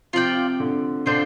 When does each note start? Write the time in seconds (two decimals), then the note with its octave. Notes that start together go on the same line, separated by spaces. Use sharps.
0.13 C3 F3 F4 D5 G5
0.60 D3
1.06 D3 D4 F4 C5 G5